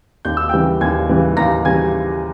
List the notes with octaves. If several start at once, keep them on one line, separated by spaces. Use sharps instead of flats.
D#2 G6
E6
C#3 E3 G3 G5 G6
D#2 G#5 G#6
C#3 E3 G3
D#2 A#5 A#6
C#3 E3 G3 G#5 G#6